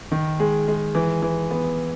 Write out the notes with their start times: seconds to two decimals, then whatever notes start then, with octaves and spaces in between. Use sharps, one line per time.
0.12 D#3
0.40 G#3
0.68 G#3
0.95 E3
1.22 E3
1.51 B3